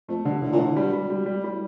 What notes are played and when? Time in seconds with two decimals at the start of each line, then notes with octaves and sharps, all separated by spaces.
0.09 F2 A3
0.24 G2 D3
0.42 A2 D3
0.52 A#2
0.59 A2 D3
0.76 G2 G3
0.93 G3
1.10 G3
1.26 G3
1.43 A2 G3